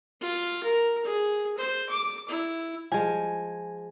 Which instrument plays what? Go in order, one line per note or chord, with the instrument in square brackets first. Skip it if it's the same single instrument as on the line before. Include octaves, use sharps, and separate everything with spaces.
[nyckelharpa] F4
A#4
G#4
C5
D6
E4
[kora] F3 G#3 [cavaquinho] G#5